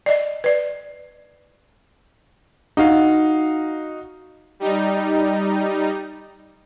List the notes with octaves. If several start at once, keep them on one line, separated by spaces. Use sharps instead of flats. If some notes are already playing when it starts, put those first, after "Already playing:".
D5 D#5
B4 D5
D#4 F#4 F5
G3 D#4